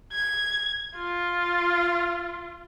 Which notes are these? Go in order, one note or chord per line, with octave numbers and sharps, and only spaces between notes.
G#6
F4